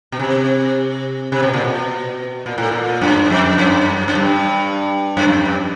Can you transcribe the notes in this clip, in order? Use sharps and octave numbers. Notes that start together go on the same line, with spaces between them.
B2
C3
C3
B2
A#2
B2
A#2
A2
A#2
F#2
F2
F#2
F#2
G2
F#2
F2
G2